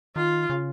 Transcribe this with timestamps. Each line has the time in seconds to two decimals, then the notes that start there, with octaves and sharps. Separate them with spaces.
0.16 D#3 F4
0.50 C#3